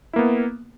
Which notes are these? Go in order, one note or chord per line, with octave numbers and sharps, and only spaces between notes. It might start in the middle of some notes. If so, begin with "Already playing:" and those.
A#3 B3 E4